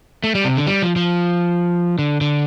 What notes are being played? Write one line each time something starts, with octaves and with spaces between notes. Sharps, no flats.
A3
G3
C3
D3
G3
F3
F3
D3
D3